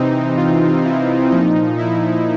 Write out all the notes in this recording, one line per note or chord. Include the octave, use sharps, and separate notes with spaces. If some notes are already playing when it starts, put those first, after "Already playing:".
Already playing: C3 E3 C4 D#4
F4
E4
A#2 F3 D#4
E4